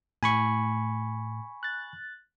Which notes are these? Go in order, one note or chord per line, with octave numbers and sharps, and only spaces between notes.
A2 G#5 B5 C#6
F#6 A6